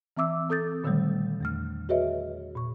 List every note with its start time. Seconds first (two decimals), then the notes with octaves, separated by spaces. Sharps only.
0.17 E3 C4 E5 D6 E6
0.49 C4 A4 D#6 G6 A6
0.84 A#2 D3 D#3 F#3 G3 A3
1.40 E2 A3 F6
1.89 F#4 G#4 B4 C#5 D#5 E5
2.55 A#2 C#6